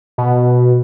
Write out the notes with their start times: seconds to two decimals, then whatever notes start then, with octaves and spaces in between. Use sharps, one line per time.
0.18 B2